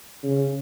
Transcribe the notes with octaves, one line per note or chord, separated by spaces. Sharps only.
C#3